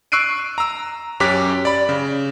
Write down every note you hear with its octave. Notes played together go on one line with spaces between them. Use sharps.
C#6 E6 F#6 C7 D7 D#7
A#5 E6
F#2 C#4 G4 D6 F#6 B6
D5 B5
C#3